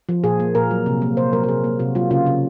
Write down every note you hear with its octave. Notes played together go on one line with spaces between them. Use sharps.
F3
A#2 G#4
A#3
A#2 A#4
F#3
C3
A#3
C3 C5
F#3 A#4
A#4
C3 G#4
A#3
C3 F#4
F#3 F4
C#3 F4
C#3